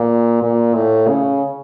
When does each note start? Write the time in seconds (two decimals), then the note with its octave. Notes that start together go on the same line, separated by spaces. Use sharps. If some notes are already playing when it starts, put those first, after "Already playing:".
Already playing: A#2
0.42 A#2
0.74 A2
1.07 C#3